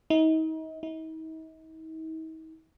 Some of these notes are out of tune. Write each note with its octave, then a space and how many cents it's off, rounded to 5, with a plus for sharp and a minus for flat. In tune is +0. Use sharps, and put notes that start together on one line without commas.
D#4 +35
D#4 +45